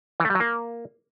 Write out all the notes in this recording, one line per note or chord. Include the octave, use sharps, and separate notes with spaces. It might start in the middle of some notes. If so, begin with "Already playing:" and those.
E3
A3
G3
F#3
A#3